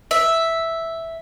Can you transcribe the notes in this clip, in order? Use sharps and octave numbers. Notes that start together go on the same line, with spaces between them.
E5